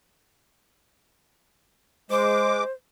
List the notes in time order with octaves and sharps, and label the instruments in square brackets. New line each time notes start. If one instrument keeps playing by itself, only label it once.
[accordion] G#3 D6 [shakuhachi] C5